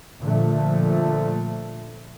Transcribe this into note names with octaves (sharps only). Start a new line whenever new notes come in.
A#2 D3 F3 A3